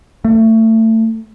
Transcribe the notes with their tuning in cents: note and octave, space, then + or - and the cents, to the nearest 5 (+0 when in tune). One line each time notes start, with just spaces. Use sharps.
A3 +25